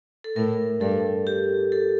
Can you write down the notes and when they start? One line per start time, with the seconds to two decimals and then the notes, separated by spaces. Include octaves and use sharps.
0.24 A4
0.36 A2 A#4
0.81 G2 A4
1.27 G4
1.72 A4